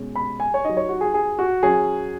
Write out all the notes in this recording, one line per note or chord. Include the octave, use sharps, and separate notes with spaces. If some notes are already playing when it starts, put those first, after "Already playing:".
Already playing: B2 G#3 C#4
B5
G#5
C#5
F#3 D#4 D#5
C#5
F#4
G#4
G#4
F#4
F#3 C#4 G#4